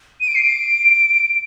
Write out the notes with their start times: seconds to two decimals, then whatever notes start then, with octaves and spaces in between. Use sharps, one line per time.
0.21 D#7
0.28 D7
0.35 C7
0.42 D7